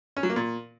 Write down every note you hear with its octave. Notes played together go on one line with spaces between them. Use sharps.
C#4
F#3
A#3
A#2